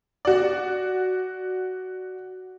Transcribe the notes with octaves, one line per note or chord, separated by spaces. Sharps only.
F#4 D5